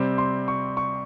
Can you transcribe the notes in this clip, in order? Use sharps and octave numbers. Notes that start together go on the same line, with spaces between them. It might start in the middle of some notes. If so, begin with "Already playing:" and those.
Already playing: C3 G3 C4
C6
C#6
C#6